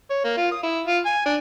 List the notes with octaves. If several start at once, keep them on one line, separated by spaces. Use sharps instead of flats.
C#5
A#3
F4
D#6
E4
F4
G#5
D4